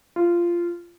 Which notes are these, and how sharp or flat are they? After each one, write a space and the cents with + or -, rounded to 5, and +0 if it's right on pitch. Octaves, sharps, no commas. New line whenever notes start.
F4 -15